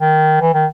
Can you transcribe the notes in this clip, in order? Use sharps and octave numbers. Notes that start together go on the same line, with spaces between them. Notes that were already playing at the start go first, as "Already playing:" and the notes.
D#3
E3
D#3